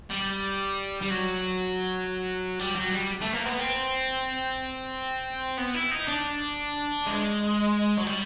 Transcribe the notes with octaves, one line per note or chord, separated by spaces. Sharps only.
G3
G3
F#3
G3
F#3
G3
A3
A#3
B3
C4
B3
E4
D#4
D4
G#3
F#3
G3